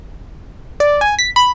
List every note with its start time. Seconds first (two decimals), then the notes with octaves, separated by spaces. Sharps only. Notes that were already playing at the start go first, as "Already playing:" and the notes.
0.80 D5
1.01 G#5
1.19 B6
1.36 B5